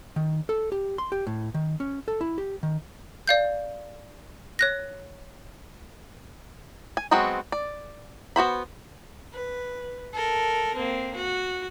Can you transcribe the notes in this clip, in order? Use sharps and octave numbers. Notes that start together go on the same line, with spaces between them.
D#3
A4
G4
C6
G4
A2
D#3
C#4
A4
E4
G4
D#3
D5 F5 G6
C#5 F#6 A#6
G#5
F#3 G#3 B3 C4 F#4
D5
B3 F#4 C5 B5
B4
A4 A#4
A#3 C4
F#4